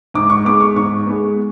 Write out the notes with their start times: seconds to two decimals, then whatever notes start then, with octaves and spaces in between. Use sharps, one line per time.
0.14 G#2 D6
0.30 C#6
0.45 G#3 B3 D6
0.60 C#6
0.76 G#2 C#6
1.07 G#3 B3